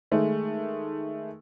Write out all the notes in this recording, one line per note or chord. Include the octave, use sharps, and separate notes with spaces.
D#3 G#3 A3